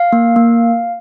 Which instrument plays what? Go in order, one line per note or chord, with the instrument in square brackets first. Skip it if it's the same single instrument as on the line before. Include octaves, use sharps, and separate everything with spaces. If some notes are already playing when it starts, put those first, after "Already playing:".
Already playing: [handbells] F5
A#3
A#3